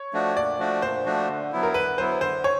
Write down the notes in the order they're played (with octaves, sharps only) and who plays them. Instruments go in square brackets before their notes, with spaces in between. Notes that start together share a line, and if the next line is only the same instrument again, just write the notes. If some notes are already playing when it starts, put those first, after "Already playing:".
Already playing: [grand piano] C#5
[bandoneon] F3 A3 D4 F#4
[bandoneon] A#2 [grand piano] D5
[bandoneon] F3 A3 D4 F#4
[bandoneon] A#2 [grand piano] C5
[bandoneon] F3 A3 D4 F#4
D3
F#3 B3 E4
[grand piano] A#4
[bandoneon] D3 [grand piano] B4
[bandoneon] F#3 B3 E4 [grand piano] C5
[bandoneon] D3 [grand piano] C5
[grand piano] C#5